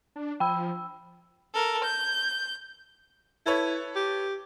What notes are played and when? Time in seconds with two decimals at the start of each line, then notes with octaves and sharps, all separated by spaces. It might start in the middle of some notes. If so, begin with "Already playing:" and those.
0.16 D4
0.40 F3 G5 B5 E6
1.54 A4 A#4
1.84 G6
3.46 E4 A4 B4 C#5
3.96 G4